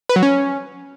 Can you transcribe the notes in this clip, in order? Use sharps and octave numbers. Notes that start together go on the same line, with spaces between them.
B4
F#3
C#4